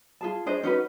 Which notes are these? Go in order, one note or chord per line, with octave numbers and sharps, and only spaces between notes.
F4 G#4 A5
D4 G#4 C5 D#5
C#4 D#4 F#4 B4